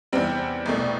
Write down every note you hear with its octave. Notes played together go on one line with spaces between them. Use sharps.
E2 C3 G3 C4
C2 B2 A3